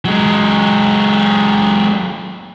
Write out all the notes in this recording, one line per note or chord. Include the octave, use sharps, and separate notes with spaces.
F#3 G#3